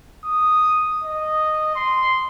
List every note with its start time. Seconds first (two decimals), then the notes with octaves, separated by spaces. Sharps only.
0.24 D#6
1.03 D#5
1.75 C6